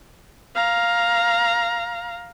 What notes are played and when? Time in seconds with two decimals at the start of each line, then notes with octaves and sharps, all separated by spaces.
0.55 F5 A#5